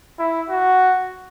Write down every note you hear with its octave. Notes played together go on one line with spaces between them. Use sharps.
E4
F#4